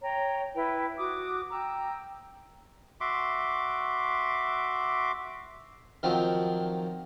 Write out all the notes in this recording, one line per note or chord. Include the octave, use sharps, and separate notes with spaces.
C#5 G5 A#5
E4 B4 G5
F#4 D6 D#6
G5 A#5 E6
F#4 E5 C6 D6
D#3 F3 F#3 C4